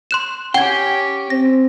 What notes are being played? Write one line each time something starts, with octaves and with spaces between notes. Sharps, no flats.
C6 F#6 E7
C#4 G4 F#5 G5 G#6
C4 A#6